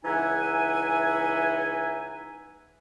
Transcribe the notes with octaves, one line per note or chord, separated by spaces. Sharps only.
C#2 E3 D#4 E5 F#5 G#5